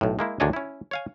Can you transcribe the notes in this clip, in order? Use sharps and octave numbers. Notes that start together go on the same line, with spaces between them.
B1 A2
G#3 A#3 E4
D2 D#3 D4 G#4 C#5 D#5
C#4 E4
C#5 F5 G#5